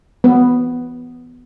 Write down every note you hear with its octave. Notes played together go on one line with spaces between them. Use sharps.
B3